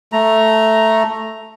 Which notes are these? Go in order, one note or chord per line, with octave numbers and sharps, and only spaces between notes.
A3 A#5